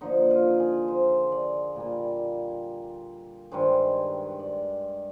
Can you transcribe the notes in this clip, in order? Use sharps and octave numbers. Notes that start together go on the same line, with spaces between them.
D3 F3 A#3 D#4
F4
G#4
C5
D5
A#2 G3 A#3
G2 D#3 G#3 C5
D5